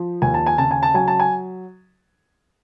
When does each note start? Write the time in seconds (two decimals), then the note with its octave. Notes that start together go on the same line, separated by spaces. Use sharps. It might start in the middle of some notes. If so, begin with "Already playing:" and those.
Already playing: F3
0.22 D#2 G#5
0.34 A5
0.46 G#5
0.58 C#3 A5
0.71 G#5
0.83 A5
0.94 F#3 G#5
1.08 A5
1.20 G#5